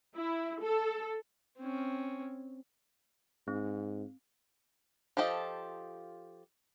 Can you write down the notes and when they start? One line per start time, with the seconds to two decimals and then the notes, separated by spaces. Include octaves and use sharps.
0.16 E4
0.62 A4
1.58 C4 C#4
3.48 G#2 C4
5.17 F3 F4 G4 A4 D#5